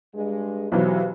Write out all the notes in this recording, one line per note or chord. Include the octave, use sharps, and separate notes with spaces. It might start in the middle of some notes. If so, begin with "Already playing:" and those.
G2 G#3
B1 E3 F#3 F#4 G4 C5